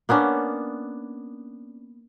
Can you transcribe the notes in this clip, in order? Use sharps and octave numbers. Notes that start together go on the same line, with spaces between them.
A#3 B3 C#4 D4